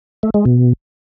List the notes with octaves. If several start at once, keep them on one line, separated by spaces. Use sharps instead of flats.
A3
G#3
B2